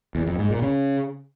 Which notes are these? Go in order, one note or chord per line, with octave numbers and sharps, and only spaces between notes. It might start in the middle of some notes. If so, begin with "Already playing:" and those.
E2
F2
G#2
A#2
C#3